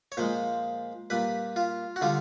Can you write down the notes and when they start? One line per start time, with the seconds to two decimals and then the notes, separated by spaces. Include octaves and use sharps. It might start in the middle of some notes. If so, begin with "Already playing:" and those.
0.12 C#5
0.17 A#2 F3 G#3 C5
1.10 A#2 G3 B4
1.56 F4
1.96 F#4
2.01 D3 G3 F4